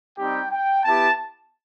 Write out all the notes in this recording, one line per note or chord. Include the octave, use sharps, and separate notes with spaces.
G3 C4 D#4 G4 G5
G5
B3 E4 G4 A5